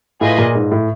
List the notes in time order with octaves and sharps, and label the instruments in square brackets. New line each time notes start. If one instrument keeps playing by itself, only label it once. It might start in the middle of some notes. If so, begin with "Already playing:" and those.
[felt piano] A2 [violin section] F4 G#4 B4 D#5 G#5
[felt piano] A#2
G#2
A2